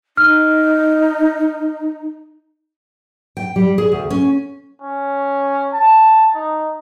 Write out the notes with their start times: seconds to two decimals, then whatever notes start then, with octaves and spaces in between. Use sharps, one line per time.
0.17 D#4 F6
3.37 G5
3.56 G3
3.78 G#4
3.92 D2
4.10 C#4
4.82 C#4
5.73 A5
6.34 D#4